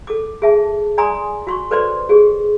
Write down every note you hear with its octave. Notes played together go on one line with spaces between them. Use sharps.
A4 D6
G#4 E5 A5
D5 G#5 A#5 C6 D#6
F#4 C6 C#6
A4 B4 C5 D5 D#5 C6
G4 G#4